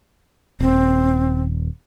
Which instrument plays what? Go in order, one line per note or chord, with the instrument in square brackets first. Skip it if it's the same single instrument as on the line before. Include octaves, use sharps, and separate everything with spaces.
[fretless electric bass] D#1 [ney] C4